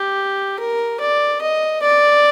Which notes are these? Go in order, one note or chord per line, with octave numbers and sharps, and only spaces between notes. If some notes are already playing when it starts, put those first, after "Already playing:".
Already playing: G4
A#4
D5
D#5
D5